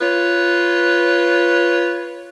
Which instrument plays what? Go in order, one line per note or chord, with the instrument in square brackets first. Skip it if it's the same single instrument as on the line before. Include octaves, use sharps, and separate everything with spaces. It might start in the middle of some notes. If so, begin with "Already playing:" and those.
[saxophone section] F4 B4 C#5